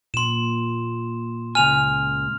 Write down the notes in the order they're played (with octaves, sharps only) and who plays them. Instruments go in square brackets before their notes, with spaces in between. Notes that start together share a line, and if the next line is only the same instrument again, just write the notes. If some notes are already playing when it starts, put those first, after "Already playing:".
[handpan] A#2 [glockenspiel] C6 E7
[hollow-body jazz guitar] C#2 G#5 [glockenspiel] F6 F7